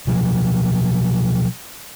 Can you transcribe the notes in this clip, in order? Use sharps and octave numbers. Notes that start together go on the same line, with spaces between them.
B2 F3 F#3